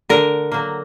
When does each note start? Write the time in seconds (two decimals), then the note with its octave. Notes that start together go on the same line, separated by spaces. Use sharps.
0.09 D3 A#4
0.52 F#3 A#3